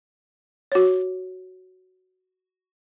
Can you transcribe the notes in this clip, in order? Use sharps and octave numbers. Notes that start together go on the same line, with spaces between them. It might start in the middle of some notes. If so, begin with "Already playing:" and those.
F#4 C#5